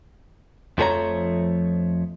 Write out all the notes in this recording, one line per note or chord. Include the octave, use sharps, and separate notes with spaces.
F2 F3 A3 G#4 C#5 A#5